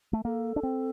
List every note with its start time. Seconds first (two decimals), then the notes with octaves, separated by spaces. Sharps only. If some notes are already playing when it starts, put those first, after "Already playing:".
0.13 A3
0.25 A#3 A4
0.56 D4
0.63 C4